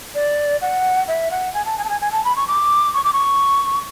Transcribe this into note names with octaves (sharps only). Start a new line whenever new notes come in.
D5
F#5
E5
F#5
G#5
A5
G#5
A5
G#5
G#5
A5
B5
C#6
D6
C#6
D6
C#6